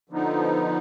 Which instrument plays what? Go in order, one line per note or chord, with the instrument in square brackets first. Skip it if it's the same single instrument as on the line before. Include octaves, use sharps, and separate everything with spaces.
[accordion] D3 F3 B3 D#4